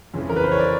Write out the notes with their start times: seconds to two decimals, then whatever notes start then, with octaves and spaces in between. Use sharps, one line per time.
0.14 F2 C#3 E3
0.30 A#4
0.36 B4
0.44 C5
0.51 C#5
0.59 D5